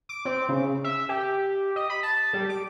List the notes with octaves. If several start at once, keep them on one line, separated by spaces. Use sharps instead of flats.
D6
C4
C#3
E5
G4
D#5
B5
A5
G3
D6